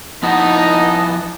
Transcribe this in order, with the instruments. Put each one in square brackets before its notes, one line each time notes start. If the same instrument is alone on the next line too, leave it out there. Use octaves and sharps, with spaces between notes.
[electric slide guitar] F3 E4 F#5 [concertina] B3 D#5 A5 [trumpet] D#4